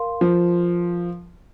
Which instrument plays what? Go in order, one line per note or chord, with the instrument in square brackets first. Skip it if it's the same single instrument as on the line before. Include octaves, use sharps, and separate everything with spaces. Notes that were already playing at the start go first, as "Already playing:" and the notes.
Already playing: [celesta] A#4 F5 C6
[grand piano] F3